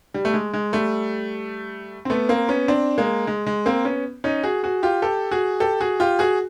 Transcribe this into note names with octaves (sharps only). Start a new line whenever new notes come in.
G3
A3
G#3
G#3
G3 A3
C4
A3 B3
A#3 C4
B3 C#4
C4 D4
G#3 A#3
G#3
G#3
A#3 C4
B3 C#4
C#4 D#4
F#4 G#4
F#4 G#4
F4 G4
G4 A4
F#4 G#4
G4 A4
F#4 G#4
F4 G4
F#4 G#4